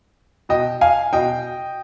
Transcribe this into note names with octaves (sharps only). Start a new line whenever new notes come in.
B2 D#5 G5
F5 G#5
B2 D#5 G5